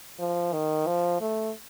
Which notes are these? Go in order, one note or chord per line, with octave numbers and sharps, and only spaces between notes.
F3
D#3
F3
A3